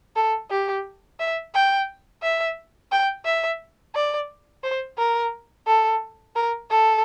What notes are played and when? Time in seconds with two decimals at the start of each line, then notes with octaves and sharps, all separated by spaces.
0.16 A4
0.50 G4
1.20 E5
1.54 G5
2.23 E5
2.92 G5
3.25 E5
3.95 D5
4.63 C5
4.98 A#4
5.67 A4
6.35 A#4
6.70 A4